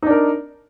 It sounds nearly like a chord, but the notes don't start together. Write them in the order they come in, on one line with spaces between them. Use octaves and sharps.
D#4 D4 A#4